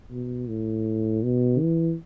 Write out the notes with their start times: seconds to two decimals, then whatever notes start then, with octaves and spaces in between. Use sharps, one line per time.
0.11 B2
0.48 A2
1.23 B2
1.61 E3